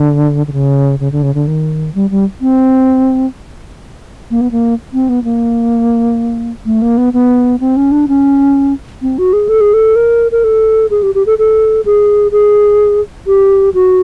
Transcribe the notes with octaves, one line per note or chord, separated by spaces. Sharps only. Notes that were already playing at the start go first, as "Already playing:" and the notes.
Already playing: D3
D3
C#3
C#3
D3
C#3
D3
D#3
G3
G3
C4
A#3
B3
A#3
C4
B3
A#3
A3
A#3
B3
B3
C4
C#4
D4
C#4
C4
F#4
G#4
A4
G#4
A4
A#4
A#4
A4
G#4
G4
G4
A4
A4
G#4
G#4
G4
F#4